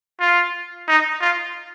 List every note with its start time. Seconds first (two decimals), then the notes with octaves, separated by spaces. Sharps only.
0.20 F4
0.88 D#4
1.21 F4